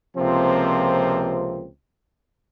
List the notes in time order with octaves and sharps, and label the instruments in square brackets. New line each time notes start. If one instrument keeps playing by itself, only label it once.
[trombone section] C#2 C3 F3 A#3 C4